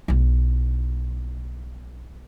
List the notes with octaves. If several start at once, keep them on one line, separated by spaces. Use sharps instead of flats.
B1 E4